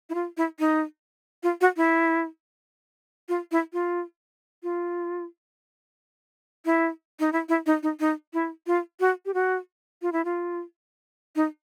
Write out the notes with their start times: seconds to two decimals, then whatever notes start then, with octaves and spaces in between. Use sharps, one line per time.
0.10 E4
0.14 F4
0.37 E4
0.60 D#4
1.43 F4
1.61 F#4
1.77 E4
3.29 F4
3.52 E4
3.73 F4
4.63 F4
6.65 E4
7.20 D#4
7.33 E4
7.49 E4
7.66 D#4
7.83 D#4
8.00 D#4
8.33 E4
8.67 F4
9.00 F#4
9.26 G4
9.34 F#4
10.02 F4
10.13 E4
10.25 F4
11.36 D#4